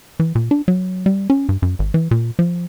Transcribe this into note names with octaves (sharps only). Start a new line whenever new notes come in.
E3
A#2
D4
F#3
G3
C#4
G2
F#2
G#1
E3
A#2
F3